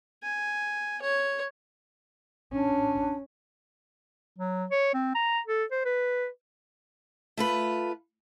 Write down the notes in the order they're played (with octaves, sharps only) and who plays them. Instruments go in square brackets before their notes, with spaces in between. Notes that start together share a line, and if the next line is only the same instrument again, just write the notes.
[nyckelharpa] G#5
C#5
[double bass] C#4 [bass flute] D4
[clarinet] F#3
C#5
C4
A#5
A4
C5
B4
[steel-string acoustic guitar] A3 F4 B4